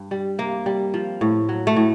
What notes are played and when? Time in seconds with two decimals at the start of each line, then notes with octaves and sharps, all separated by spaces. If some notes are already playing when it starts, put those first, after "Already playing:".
Already playing: G2
0.11 G3
0.38 C3 A#3
0.66 G3
0.94 F3
1.21 A2
1.49 F#3
1.67 A3
1.76 A2